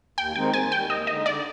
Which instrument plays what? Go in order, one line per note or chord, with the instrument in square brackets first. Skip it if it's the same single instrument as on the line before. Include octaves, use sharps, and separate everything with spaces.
[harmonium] D#2 [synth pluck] G5
[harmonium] D#3 G#3 C4 D#4 [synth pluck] G5
[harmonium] D#2 [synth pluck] G#5
[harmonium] D#3 G3 [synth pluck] G5
[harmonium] D#2 [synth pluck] D#5
[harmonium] D3 G#3 D#4 [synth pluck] D#5
[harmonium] D3 [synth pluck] D5